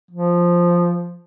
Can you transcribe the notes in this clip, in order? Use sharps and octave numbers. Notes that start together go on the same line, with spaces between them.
F3